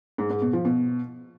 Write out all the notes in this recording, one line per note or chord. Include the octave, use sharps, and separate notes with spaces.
G#2
G#2
B2
F3
B2